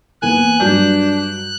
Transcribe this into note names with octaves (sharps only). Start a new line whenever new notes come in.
E2 A#3 B3 G#5 F#6
G2 F#3 D4 G6